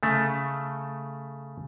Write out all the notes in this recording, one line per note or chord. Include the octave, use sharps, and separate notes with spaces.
C#3 A3